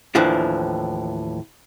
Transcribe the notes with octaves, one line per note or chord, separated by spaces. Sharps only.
D#2 A2 E3 F3 D4